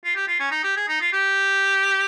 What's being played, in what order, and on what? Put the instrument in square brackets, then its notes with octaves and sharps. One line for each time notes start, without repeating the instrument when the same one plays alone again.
[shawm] F4
G4
F4
C#4
D#4
G4
G#4
D#4
F4
G4